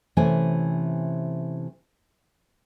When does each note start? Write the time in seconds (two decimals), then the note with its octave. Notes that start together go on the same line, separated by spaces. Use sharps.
0.17 C3 E3 A3 C#4 G#5